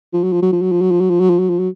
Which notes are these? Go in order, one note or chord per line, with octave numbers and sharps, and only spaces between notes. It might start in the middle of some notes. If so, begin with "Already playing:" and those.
F3
F#3
F3
F#3
F3
F#3
F3
F#3
F3
F#3
F3
F#3
F3
F#3
F3
F#3